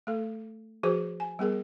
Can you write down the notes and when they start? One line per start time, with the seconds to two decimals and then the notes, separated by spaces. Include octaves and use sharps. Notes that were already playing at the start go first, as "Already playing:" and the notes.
0.07 A3 A4
0.83 F3 F#4 G#4 B4 C5
1.20 G#5
1.39 G3 B3 G#4 A#4